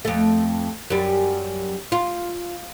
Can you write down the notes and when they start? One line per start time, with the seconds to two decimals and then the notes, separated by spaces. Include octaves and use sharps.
0.05 F2 A3
0.90 F#2 G3
1.92 F4